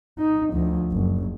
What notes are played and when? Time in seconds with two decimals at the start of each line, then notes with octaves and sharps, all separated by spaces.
0.19 D#4
0.53 D2 F3
0.93 F#1